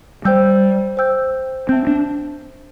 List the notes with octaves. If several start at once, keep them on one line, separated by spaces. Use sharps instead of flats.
G3 C5 G5 E6 G6
C5 G5 E6 G6
C4 E5 A5 E6 G6
D4